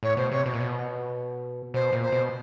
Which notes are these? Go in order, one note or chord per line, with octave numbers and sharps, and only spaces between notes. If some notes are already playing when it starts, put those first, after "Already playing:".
A2 C#5
B2 C5
C3 C#5
B2
A#2
B2
B2 C5
A#2
C5
B2